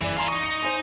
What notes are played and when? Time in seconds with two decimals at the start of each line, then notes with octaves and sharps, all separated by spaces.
0.01 F#1 E3 D5
0.17 E4 F4 G#5 A#5 C6
0.28 D#4 D#5 C#6
0.43 C#7
0.63 C5 G#5